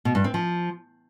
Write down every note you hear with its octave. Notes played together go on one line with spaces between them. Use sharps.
B2
G2
C4
F3